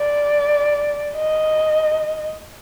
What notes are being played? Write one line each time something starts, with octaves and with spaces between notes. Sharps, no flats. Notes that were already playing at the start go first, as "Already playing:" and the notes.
Already playing: D5
D#5